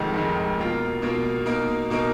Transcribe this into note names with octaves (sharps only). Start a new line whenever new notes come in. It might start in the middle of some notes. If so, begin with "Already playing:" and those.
Already playing: F1 F2 D#3 G#3 D#4
F1 F2 D#3 G#3 D#4
B2 A#3 F4 A#4
B2 A#3 F4 A#4
B2 A#3 D#4 A#4
B2 A#3 D#4 A#4